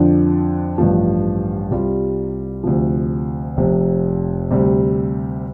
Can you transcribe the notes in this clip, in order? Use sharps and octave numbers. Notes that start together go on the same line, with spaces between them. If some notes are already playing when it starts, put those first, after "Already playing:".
Already playing: F2 D3 F3 D4
A1 G2 F3
C2 C3 G3 F4
D2 C3 F3
F1 F2 C3
D2 C3 G3